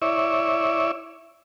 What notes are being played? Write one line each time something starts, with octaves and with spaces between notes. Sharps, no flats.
E4 C#5 D5 E5